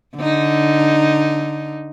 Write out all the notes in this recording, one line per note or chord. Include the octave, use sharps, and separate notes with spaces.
D3 D#4